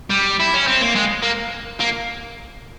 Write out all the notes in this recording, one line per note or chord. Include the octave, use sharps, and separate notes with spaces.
G3
E4
C#4
C4
A#3
G#3
A#3
A#3